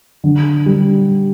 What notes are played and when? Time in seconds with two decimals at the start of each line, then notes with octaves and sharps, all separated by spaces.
0.24 D3
0.66 G3